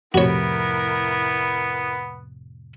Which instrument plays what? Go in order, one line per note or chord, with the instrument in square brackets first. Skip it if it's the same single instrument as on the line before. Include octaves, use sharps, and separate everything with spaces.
[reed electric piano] F2 A2 C3 [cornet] B3 [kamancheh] E4 A#4 [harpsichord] F#4 C#5